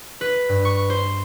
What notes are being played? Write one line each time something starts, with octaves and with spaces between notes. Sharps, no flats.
B4
G2
C#6
C5